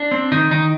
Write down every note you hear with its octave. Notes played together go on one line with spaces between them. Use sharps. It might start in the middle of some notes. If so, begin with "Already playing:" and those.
Already playing: D4
C4
D#3 D#4
D#3 D#4